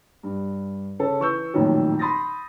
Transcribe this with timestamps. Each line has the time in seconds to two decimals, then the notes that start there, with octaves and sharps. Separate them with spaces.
0.23 G2
0.99 C#3 C#4 A4
1.20 E3 C#6 E6 G6
1.54 A1 F2 A#2 D#3 F#3
1.99 B5 C6 D#6 A6 A#6